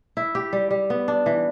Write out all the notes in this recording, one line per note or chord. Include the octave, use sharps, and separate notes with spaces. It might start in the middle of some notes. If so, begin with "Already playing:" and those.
E4
G4
G3
G3
B3
D4
E3